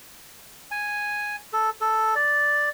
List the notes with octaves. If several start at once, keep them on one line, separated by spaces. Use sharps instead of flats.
G#5
A4
A4
D5